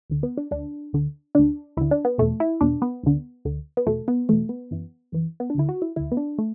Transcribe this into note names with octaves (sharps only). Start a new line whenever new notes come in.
D2 D3
B3
D4
D2 D3 D4
D2 D3
D2 D3 D4
D2 D3 E4
D4
B3
E2 B2 A3
E4
E2 B2 D4
B3
D2 D3
D2 D3
B3
E2 B2 A3
B3
E2 B2 A3
B3
F#2 E3
F#2 E3
B3
D4
D2 D3 E4
F#4
E4
D2 D3 E4
B3
D4
A3